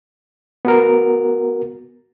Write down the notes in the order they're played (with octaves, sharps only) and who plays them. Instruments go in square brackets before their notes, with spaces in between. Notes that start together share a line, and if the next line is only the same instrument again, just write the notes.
[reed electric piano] B3 F#4 A#4